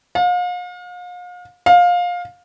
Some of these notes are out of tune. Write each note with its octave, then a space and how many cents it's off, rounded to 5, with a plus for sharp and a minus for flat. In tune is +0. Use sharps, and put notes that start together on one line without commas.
F5 +40
F5 +20